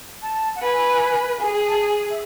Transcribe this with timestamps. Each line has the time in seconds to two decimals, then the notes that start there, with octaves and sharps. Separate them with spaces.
0.22 A5
0.55 F#5
0.61 B4 G#5
1.40 G#4 G#5
1.54 G#5
1.66 A5
1.79 G#5
2.10 E5